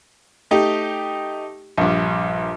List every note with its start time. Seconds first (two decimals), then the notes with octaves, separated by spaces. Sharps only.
0.51 A3 D#4 G4
1.78 A#1 G2